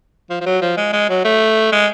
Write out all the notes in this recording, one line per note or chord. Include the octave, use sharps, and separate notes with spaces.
F3
F3
F#3
F3
G#3
G#3
F#3
A3
G#3